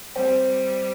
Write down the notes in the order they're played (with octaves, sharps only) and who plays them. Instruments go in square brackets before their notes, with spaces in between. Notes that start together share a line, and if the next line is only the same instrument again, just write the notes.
[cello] G3 [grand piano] C4